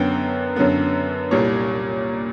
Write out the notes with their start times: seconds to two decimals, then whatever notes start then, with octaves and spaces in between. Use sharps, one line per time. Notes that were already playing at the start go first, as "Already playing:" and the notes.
Already playing: F#2 D3 F#3 B3 G5
0.56 F#2 D3 F#3 B3
1.31 C2 A#2 G3 C#5